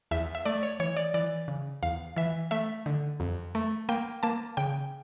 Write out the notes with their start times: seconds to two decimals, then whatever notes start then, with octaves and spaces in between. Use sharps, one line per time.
0.11 E2 E5
0.35 E5
0.45 A3 D5
0.63 C#5
0.80 E3 C#5
0.97 D5
1.14 E3 D5
1.48 C#3
1.83 E2 F5
2.16 E3 E5
2.51 A3 E5
2.86 D3
3.20 F2
3.55 A3
3.89 A#3 G5
4.23 A#3 A5
4.57 C#3 G5